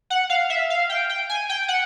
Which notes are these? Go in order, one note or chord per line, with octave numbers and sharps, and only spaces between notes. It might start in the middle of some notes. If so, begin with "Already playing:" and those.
F#5
F5
E5
F5
G5
G5
G#5
G5
F#5